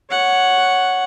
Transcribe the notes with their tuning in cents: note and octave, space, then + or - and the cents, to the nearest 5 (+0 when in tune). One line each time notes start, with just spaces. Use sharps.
C#5 +0 F#5 +0